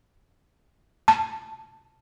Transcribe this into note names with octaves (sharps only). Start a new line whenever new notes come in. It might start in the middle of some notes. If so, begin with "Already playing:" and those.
A5